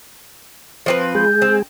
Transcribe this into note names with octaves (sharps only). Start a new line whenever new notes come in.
F3 C4 B4
G#3 G#4 G6
C4